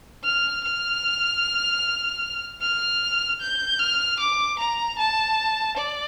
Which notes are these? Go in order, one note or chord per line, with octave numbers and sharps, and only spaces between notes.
F6
F6
F6
G6
F6
D6
A#5
A5
D5